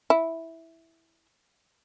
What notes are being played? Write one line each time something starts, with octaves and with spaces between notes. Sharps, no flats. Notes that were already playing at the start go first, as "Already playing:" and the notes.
E4